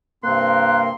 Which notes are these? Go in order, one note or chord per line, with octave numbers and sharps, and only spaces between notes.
G2 C3 A#3 C4 C6 F#6